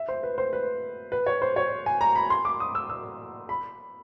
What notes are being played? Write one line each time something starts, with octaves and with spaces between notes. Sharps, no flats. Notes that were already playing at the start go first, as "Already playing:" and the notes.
Already playing: E5
C5
B4
C5
B4
B4
C#5
C5
C#5
G#5
A#5
B5
C6
D6
D#6
E6
E6
B5